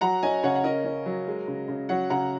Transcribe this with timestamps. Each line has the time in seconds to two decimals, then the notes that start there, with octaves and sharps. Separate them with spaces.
0.01 F#3 F#5 A#5
0.23 C#4 D#5 G#5
0.43 C#3 C#5 F#5
0.55 F#5
0.64 C#4 A#4 D#5
0.85 C#4
1.06 F#3
1.27 G#3
1.48 C#3
1.68 C#3
1.89 F#3 C#5 F#5
2.10 C#3 F#5 A#5